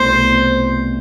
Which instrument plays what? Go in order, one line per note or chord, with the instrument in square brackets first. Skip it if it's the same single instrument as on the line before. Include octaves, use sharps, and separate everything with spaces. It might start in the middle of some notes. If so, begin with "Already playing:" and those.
Already playing: [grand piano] C2 B2 A3 E4 [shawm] C5